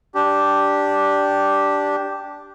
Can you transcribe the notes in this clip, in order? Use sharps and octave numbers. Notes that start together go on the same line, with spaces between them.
D4 G4